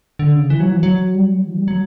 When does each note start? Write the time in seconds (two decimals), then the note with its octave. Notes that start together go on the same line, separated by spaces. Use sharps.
0.19 D3
0.35 C#3
0.50 E3
0.60 F#3
0.69 E3
0.83 F#3
1.15 G3
1.31 F#3
1.47 E3
1.57 G3
1.68 F#3